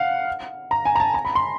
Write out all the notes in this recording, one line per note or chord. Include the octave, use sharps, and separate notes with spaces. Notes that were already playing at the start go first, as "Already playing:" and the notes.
Already playing: F5 F#5
A#5
G#5
A#5
A5
A#5
B5
C6